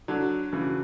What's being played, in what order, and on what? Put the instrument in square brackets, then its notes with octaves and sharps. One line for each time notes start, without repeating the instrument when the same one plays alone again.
[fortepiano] D3 F#3 [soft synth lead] F#4
[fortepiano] C#3 E3